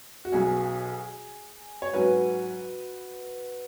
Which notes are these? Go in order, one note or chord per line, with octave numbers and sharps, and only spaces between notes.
F#4
B1 B2 F#3 C#4 G#4
C#5
G#2 F#3 C#4 F#4 B4